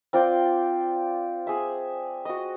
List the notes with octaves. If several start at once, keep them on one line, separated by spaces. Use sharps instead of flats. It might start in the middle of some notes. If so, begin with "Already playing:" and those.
C4 F4 D5 G5
G#4 E5
F#4 D#5